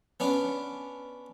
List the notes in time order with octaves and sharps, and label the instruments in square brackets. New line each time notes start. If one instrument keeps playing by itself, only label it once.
[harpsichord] B3 C#4 D4